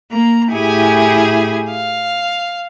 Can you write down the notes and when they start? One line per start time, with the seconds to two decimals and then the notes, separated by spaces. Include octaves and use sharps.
0.11 A#3 A#5
0.51 A2 E4 G4 G#4 G#5
1.71 F5